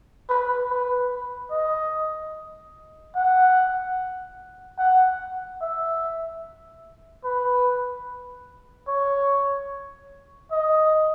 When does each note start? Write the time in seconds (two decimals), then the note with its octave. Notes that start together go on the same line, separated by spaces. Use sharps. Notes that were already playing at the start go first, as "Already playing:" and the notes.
0.29 B4
0.70 B4
1.51 D#5
3.16 F#5
4.78 F#5
5.61 E5
7.25 B4
8.88 C#5
10.52 D#5